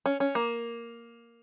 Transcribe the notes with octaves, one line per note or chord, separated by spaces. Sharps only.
C#4
C#4
A#3